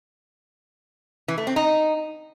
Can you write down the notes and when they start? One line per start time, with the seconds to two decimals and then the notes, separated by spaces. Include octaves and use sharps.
1.28 E3
1.38 A3
1.47 C4
1.56 D#4